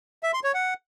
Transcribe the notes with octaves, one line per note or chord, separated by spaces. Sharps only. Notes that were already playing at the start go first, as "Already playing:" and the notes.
E5
C6
C#5
F#5